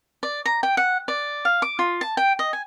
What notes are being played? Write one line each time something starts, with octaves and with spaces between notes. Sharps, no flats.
D5
A#5
G5
F#5
D5
F5
D6
F4
A5
G5
D#5
G#5